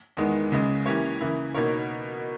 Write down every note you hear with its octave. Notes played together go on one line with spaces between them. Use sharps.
E2 D#3 G#3 B3
C#2 C#3 G#3
E3 A#3 C#4 G4 C#5
C#3 E3 A#3 E4
B2 A#3 D#4 A#4 C#5